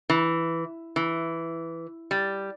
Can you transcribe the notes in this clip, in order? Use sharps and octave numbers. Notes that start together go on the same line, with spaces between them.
E3
E3
G3